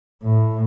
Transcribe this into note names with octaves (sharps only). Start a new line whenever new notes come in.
A2